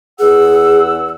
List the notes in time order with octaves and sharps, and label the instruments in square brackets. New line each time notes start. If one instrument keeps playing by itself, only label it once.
[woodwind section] E2 F#5 E6 [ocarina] G#4